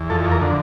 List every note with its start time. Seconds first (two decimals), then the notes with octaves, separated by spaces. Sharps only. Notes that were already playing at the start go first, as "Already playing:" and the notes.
Already playing: E2
0.10 F2 A4
0.31 A#4
0.42 D3